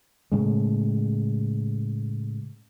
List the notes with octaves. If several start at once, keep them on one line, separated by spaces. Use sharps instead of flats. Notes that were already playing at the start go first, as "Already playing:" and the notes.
A2 C#3 G#3